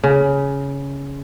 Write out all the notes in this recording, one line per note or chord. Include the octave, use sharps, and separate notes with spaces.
C#3